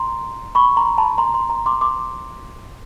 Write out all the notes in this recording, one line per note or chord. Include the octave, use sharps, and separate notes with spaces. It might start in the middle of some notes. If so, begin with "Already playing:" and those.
Already playing: A#5 C6
B5 C#6
A#5 C6
A5 B5
A#5 C6
A#5 C6
A#5 C6
C6 D6
C6 D6